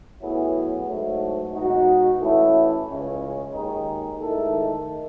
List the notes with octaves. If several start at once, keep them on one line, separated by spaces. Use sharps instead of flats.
A2 F#3 B3 E4 G#4
G#2 F#3 A3
B2 G#3 D#4 F#4
A2 E3 A3 C#4 E4
C#2 C#3 G#3 C#4
D#2 D#3 G#3 D#4
G#2 D#3 A3 E4 A4